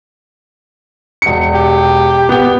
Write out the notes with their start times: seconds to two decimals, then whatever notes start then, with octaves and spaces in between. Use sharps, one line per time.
1.22 E1 C#7
1.54 G4
2.29 B3 G5